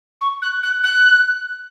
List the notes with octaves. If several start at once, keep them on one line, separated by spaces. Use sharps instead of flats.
C#6
F#6
F#6
F#6